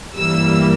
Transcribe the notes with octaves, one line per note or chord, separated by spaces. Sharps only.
G2 E3 G3 A#3 E6